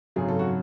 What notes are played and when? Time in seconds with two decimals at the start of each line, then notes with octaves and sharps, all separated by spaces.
0.16 G#1 F#2 C#3 F#3 G#4
0.28 A4
0.39 F#4